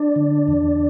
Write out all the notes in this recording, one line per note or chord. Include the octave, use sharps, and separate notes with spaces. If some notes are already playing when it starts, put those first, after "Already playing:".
Already playing: D4 D5
D3
E2